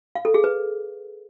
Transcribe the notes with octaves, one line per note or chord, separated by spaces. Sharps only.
F5
A4
G#4
B4